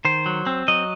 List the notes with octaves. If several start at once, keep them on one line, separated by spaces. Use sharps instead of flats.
D#3 C5
F#3
C4
F#3 D#5